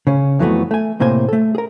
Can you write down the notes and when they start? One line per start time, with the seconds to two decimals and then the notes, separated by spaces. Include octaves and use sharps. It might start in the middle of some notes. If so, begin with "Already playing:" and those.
0.07 C#3 C#4
0.39 F2 E3 F#3 G3 A3 B3
0.71 A3 G#5
1.00 A2 C3 A#3 C5 G#5
1.29 A3 A4
1.55 G#4 A#4